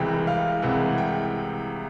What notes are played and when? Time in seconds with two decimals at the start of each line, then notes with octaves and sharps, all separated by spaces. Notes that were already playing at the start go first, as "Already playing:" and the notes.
Already playing: C2 C3 E3 G#3 G5
0.27 F5
0.62 C2 C3 E3 G#3 F#5
0.98 G5